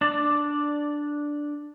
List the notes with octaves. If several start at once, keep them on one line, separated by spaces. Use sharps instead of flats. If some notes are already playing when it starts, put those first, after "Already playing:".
D4 D5